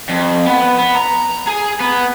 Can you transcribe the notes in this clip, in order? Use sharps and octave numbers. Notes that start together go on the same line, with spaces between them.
F2
B3
B3
A#5
G#4
B3